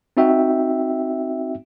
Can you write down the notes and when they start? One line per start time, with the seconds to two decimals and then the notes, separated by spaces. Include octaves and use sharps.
0.17 C4 D#4 F#4 E5 G5